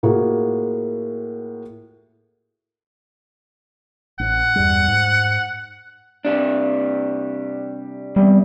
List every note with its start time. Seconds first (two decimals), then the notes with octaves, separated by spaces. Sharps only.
0.03 A2 A#3 F4 F#4 G#4
4.19 A1 F#5
4.56 E2 G2 G3
4.88 G#2
6.25 C3 G3 D4
8.16 E2 C3 G3